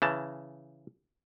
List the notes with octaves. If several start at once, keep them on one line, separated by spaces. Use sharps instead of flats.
C#3 E3 A5